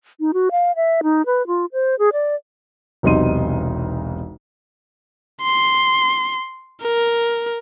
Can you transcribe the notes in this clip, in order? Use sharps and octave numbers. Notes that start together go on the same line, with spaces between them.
D#4
F#4
F5
E5
D#4
B4
F4
C5
G#4
D5
E1 B1 C3 D#4 C6 D#7
C6
A#4